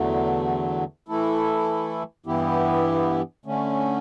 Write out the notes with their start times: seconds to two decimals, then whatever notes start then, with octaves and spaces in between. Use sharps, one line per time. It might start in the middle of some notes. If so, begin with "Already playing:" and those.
Already playing: E2 D3 F#3 A3
1.08 E3 A3 E4 A4
2.26 G2 E3 B3 E4 G4
3.46 D3 A3 C#4